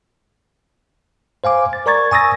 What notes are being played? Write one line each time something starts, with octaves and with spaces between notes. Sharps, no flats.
C5 F5 G#5 D6
A6
A#4 D5 A#5 C#6 G#6 A6
G#5 C#6 D#6 E6 A6 A#6